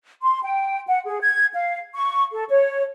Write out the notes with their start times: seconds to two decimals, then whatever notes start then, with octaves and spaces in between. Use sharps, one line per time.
0.22 C6
0.44 G5
0.88 F#5
1.07 G#4
1.22 G#6
1.54 F5
1.94 C#6
2.33 A4
2.50 C#5